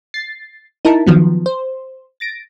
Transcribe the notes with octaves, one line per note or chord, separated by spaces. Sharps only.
A6 C7
D#4 E4 A#4 A5
D#3 F3 F#3 B3
C5
A6 A#6 D7